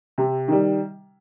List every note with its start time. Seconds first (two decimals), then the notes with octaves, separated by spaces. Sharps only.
0.18 C3
0.48 D#3 G3